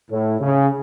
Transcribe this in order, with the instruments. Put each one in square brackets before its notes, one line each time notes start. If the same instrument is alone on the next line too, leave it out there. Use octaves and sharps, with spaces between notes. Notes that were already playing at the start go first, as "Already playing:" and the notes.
[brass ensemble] A2
C#3